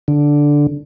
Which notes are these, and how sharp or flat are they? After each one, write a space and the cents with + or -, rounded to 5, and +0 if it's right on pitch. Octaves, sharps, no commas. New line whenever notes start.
D3 -5